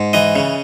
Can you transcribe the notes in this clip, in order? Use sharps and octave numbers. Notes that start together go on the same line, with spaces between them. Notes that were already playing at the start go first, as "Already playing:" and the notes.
Already playing: G#2
E3 D#5
C#3